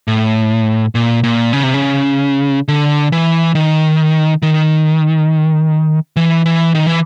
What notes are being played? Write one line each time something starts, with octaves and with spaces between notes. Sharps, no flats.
A2
A#2
A#2
C#3
C3
C#3
D3
E3
D#3
D#3
E3
E3
D#3
E3